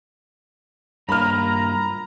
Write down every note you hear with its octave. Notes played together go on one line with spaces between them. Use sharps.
G2 A#3 F4 A#5 B5 F6